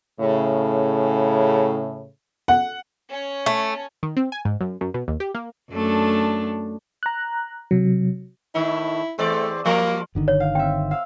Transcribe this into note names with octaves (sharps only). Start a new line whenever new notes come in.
A2 C#3
F#5
C#4 C#5
A3
D#3
C4
G#5
G#2
F#2
F#2
B2
D#2
G4
A#3
F#2 A3 D4
A#5 F#6
C3 F#3
A2 D#3 E4
E2 A3 C4 D5
F3 G3 A#3 A#4
G1 D3 D#3
C#5
F5
C4 E5 G5
F5 E6